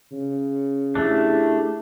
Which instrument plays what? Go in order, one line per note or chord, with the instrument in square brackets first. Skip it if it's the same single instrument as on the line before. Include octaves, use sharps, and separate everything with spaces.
[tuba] C#3
[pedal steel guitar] A3 D4 [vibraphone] E4 G4 G#4